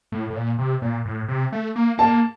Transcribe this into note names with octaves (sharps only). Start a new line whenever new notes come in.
A2
A2
A#2
C3
A#2
A2
C3
A3
A#3
A#3 A5